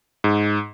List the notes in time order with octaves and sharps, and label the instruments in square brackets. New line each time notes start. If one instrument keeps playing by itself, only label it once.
[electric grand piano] G#2